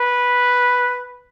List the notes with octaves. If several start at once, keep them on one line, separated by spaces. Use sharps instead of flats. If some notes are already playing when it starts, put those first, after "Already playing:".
Already playing: B4